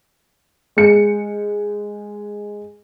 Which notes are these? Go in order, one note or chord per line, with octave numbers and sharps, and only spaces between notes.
G#3 C#7